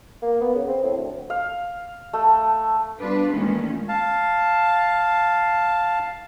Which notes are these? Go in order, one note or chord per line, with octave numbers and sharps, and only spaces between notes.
A#3
B3
C#3
C4
A2
D2
F5
A3
G3 B3 D4 F4 B4
A#2 D#3 E3 G#3 A3 C#4
F5 A5